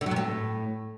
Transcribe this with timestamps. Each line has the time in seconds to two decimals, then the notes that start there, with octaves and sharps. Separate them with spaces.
0.01 D3
0.06 F#3
0.11 C3
0.16 A2